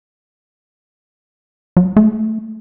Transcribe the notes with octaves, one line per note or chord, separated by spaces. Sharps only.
F#3
A3